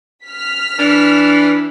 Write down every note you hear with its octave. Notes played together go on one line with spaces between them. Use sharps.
F6 B6
E3 D4